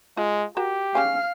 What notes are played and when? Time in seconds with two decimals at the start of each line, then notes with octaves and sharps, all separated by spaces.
0.17 G#3 F4
0.57 F#4 G4 A#4
0.95 C#3 C#4 F5 G#5 F6